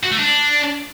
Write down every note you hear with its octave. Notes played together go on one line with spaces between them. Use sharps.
F#4
A3
D4